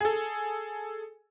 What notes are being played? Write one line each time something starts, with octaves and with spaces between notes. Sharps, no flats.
G#4 A4